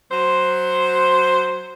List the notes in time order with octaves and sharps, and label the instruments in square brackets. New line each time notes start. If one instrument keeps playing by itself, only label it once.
[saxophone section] F#3 C5